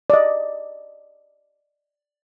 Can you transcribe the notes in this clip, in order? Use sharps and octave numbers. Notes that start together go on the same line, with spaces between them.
D5 D#5